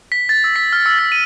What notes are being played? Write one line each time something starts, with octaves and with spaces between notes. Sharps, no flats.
B6
A6
E6
B6
F6
E6
A6
D#7